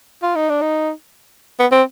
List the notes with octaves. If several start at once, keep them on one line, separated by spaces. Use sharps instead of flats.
F4
D#4
D4
D#4
B3
C4